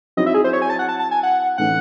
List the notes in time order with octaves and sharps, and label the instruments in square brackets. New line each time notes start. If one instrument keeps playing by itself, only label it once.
[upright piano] F#3 C4 E4 [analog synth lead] D#5
[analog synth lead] E5
G#4
C5
C#5
G#5
A5
F#5
A5
A5
G#5
F#5
[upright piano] A2 E3 A3 C#4 E4 [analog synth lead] F#5